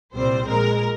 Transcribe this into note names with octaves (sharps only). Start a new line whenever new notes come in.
C2 A#2 G3 C4 C5
A#1 A#2 G#3 A#4